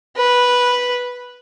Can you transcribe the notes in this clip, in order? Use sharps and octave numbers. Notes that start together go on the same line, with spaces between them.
B4